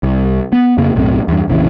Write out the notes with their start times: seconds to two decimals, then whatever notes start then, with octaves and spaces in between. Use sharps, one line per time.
0.03 C2
0.53 B3
0.78 F2 C#3 A#3
0.96 B1 F#2 A2 C4
1.28 E2 G2
1.48 F1 A#1 C#3 E3